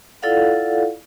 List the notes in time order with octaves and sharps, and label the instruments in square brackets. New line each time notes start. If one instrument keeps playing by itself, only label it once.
[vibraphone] E4 F4 A4 D5 F5 F#5